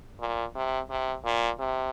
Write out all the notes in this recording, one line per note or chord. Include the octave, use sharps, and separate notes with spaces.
A#2
C3
C3
A#2
C3